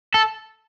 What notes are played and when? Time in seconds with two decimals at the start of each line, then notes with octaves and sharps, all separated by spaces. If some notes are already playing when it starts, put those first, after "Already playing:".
0.14 A4